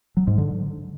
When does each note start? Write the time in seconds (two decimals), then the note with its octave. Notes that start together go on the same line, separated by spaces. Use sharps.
0.17 F#3
0.27 G#2
0.38 D3